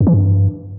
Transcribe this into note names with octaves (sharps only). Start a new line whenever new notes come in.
F#2
E3
G2